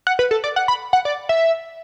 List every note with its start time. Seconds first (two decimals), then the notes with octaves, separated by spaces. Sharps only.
0.07 F#5
0.19 B4
0.31 A4
0.44 D5
0.56 F#5
0.68 B5
0.93 F#5
1.05 D5
1.29 E5